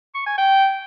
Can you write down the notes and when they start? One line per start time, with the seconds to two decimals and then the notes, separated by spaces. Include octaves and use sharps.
0.15 C#6
0.26 G#5
0.38 G5